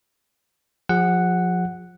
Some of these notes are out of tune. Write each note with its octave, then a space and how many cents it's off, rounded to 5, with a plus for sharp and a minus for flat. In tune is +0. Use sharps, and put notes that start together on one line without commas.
F3 +30 G#4 -25 F#5 +0